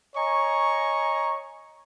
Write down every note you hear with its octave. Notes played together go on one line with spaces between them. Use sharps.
C#5 D#5 G#5 A#5 C#6